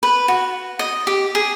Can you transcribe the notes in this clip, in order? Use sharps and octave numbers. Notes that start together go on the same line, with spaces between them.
B4
F#4
D#5
G4
G#4